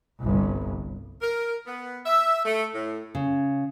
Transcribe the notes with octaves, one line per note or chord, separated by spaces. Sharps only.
G1 C2
A#4
B3
E5
A3
A2
C#3